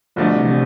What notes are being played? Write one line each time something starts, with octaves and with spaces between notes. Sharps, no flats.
C2 B2 D3 F3 A3 D4
C3 E3
C3